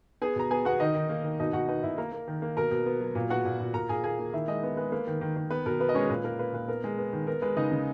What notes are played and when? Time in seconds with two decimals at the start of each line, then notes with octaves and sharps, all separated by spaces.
0.22 B3 G#4 G#5
0.36 B2 A#5
0.51 B3 G#4 G#5
0.65 B3 F#4 F#5
0.80 D#3 D#4 D#5
0.95 D#3
1.09 A#3
1.24 D#3
1.40 B2 D#4 D#5
1.53 B2 F#4 F#5
1.68 B3 D#4 D#5
1.83 B2 E4 E5
1.98 A#3 A#4 A#5
2.12 A#3
2.28 D#3
2.42 A#3
2.57 B2 A#4 A#5
2.71 B2
2.86 B3
3.01 F#3
3.15 A#2
3.30 B3 F#4 F#5
3.45 A#2
3.60 A#2
3.74 A#2 A#4 A#5
3.89 A#2 G#4 G#5
4.04 A#3 G#4 G#5
4.19 A#3
4.33 D#3 E4 E5
4.48 G#3 D#4 D#5
4.63 B3 B4
4.77 G#3 B4
4.92 A#3 B4
5.07 D#3
5.21 D#3
5.36 D#3
5.50 B3 B4
5.66 B2 A#4
5.80 B3 B4
5.89 D#5
5.94 G#3 C#4 C#5
6.09 A#2 B4
6.24 A#3 A#4
6.39 A#3 B4
6.53 A#2 B4
6.68 B3 A#4
6.84 G#3
6.98 B3
7.13 D#3
7.27 B3 A#4
7.42 G#3 B4
7.56 C#3 D#4 D#5
7.71 C#3